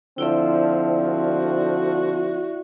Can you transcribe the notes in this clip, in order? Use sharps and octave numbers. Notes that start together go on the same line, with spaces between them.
D3 F3 C4 E4 D5 E5
F#4